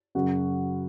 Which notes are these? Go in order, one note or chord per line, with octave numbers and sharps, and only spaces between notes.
F#2 C#3 F#3 F#4